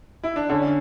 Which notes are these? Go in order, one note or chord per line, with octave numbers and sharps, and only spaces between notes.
E4
D4
D3 C#4